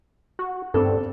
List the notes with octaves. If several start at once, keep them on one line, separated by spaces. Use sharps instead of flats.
F#4
G2 C4 A4